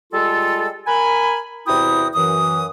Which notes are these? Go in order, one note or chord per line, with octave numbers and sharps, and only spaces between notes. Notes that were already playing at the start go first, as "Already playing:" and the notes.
G3 G#3 F4 A4
A#4 G#5 B5
E2 C3 E4 F#4 G5 D#6
F#2 E3 D#6